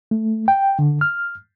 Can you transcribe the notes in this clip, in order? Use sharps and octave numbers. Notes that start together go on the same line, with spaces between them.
A3
G5
D3
F6